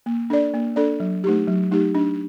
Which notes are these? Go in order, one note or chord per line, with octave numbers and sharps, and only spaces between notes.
A#3
D4 A4 D5
A#3
D4 A4 D5
F#3
A3 D#4 G4
F#3
A3 D#4 G4
D4